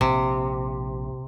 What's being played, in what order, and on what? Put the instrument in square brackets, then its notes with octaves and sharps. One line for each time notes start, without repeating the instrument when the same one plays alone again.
[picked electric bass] A#1 [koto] C3